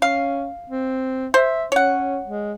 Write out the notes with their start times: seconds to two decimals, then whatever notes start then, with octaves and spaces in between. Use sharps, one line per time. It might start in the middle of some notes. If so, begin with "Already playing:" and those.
0.02 C#4 F5
0.70 C4
1.34 C5 E5
1.72 C#4 C#5 F#5
2.24 G#3